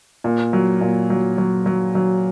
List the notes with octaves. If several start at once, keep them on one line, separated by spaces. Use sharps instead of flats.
A#2
F#3
A#2
F#3
F#3
F#3
F#3